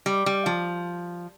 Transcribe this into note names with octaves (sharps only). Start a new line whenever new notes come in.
G3
G3
F3